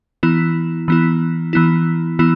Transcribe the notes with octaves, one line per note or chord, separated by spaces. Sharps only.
E3 B3 E4
E3 B3 E4
E3 B3 E4
E3 B3 E4